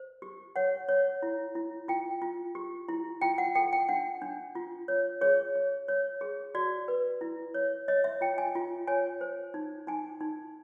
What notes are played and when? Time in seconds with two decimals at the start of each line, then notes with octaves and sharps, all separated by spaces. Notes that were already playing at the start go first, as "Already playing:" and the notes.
Already playing: C5
0.22 G4
0.56 C#5 F#5
0.89 C#5
1.23 E4
1.55 E4
1.88 F4 G5
2.22 F4
2.55 G4
2.89 E4
3.21 F4 G5
3.38 F#5
3.55 A4 G5
3.73 G5
3.89 D4 F#5
4.22 D4
4.55 F4
4.88 C#5
5.21 G#4 C#5
5.55 C#5
5.88 C#5
6.21 G#4
6.55 F#4 D5
6.88 B4
7.21 E4
7.54 C#5
7.88 C#5 D#5
8.04 E5
8.21 F4 G5
8.38 G#5
8.55 F4
8.88 C#5 G#5
9.21 C5
9.54 D#4
9.87 D#4 G#5
10.20 D#4